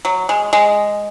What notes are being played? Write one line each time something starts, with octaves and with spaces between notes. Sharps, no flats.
F#3
G#3
G#3